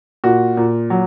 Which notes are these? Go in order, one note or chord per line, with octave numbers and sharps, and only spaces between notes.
A#2 F#4
A#2
F#3